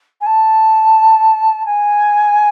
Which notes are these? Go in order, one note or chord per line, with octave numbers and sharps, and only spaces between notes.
G#5
A5
G#5